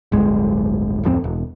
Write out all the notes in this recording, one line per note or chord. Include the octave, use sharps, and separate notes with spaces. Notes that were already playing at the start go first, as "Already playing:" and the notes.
D1 G1 G#3
D1 F2 E3 C4
E1